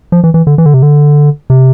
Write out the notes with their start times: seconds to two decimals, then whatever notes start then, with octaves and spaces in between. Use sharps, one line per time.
0.12 F3
0.24 E3
0.34 E3
0.47 D3
0.58 E3
0.66 D3
0.74 C3
0.83 D3
1.50 C3